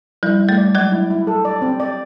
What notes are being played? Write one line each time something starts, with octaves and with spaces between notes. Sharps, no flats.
F3 G3 E4
E4
G3 A3
D5
F#3 G#3 D5
E4
E4
A4
D5
C4
D5